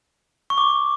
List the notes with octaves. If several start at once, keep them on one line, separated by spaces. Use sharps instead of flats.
C#6
D6